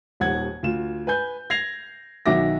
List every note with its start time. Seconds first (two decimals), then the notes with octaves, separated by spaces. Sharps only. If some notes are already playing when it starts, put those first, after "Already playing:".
0.20 D#1 D#2 F#5 G#6
0.63 D2 F4 E7
1.07 B4 G#5 G6
1.50 G#6 A#6 C7 F7
2.26 B1 D#3 F#4 E5 D6 A#6